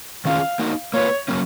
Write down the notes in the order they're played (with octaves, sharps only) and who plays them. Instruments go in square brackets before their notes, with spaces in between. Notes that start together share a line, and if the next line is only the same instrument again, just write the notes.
[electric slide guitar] D#3 F#3 C#4 F4 G#4 [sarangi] F5
[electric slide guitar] A#3 D#4 F#4
[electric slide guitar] A#3 F4 B4 [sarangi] C#5
[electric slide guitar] F#3 A#3 C#4